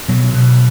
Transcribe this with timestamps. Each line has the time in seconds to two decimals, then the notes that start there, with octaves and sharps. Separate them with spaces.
0.09 B2 F#3
0.34 B2